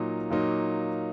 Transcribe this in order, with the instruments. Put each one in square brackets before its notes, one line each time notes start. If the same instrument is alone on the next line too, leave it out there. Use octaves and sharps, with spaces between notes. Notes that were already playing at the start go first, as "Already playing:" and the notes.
Already playing: [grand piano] A#2 F#3 A#3 D#4
A#2 F#3 A#3 D#4